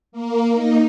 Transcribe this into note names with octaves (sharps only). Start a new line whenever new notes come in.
A#3
D#4